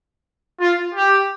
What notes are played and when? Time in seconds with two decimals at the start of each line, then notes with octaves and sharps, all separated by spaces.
0.60 F4
0.95 G4